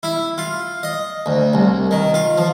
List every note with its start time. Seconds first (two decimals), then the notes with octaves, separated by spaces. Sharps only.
0.03 E4
0.38 F4
0.83 D#5
1.26 D2
1.53 C2
1.91 D#3
2.14 F4
2.38 F3